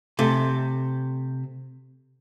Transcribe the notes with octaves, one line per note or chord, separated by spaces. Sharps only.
C3 A3